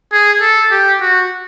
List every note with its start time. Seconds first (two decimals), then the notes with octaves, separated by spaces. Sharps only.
0.12 G#4
0.41 A4
0.71 G4
1.01 F#4